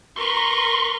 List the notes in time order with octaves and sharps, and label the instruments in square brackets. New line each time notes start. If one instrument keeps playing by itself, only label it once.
[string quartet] A#4 B4 A#5 [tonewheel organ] C6 C#6